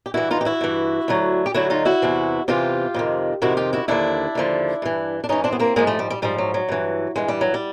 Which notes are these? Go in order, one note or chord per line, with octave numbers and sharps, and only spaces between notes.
G4
G2 E3 E4 F#4
D#4 F4
G4
E4 F#4
G2 E3
D2 D3 F#3
G4
D2 D3 F#3 E4 F#4
D#4 F4
E4 F#4
E2 C3 E3
E2 C3 E3 F4 G4
F2 C3 D#3
F2 C3 D#3 E4 F#4
F4 G4
E4 F#4
D#2 D3 F3 D4 E4
D#2 D3 F3
G2 E3
D4
G2 E3 C#4 D#4
C4 D4
B3
A#3 C4
G#2 F3 G#3 A#3
G3 A3
G3
G3
G#2 F3 G3
F#3
F#3
G2 E3
G2 E3 G#3
G3
F#3
G3